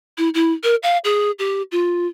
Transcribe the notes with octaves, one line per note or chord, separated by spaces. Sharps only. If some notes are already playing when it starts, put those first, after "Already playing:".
E4
E4
A#4
F5
G#4
G4
F4